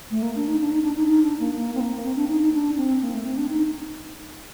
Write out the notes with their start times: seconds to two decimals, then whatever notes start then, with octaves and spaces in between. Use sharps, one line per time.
0.11 A3
0.23 A#3
0.36 D4
0.48 D#4
0.60 D4
0.71 D#4
0.83 D4
0.96 D#4
1.08 D#4
1.23 D4
1.40 A#3
1.56 A#3
1.75 C4
1.80 A#3
2.04 C4
2.16 D4
2.29 D#4
2.41 D#4
2.54 D4
2.77 C4
3.02 A#3
3.14 A3
3.25 C4
3.37 D4
3.50 D#4